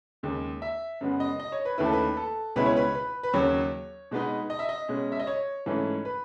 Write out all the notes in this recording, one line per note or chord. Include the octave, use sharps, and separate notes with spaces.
D#2 C#3 G#3
E5
F#2 C#3 G#3 B3
D#5
D#5
C#5
B4
D#2 D#3 A3 C#4 E4 B4
A4
B4
A4
C#2 B2 G#3 C#4 E4 B4
C#5
B4
B4
B4
D#2 C#3 F#3 C#5
B2 G#3 B3 D#4
D#5
E5
D#5
B2 G#3 C#4
E5
D#5
C#5
G#2 E3 A3 C#4 B4
B4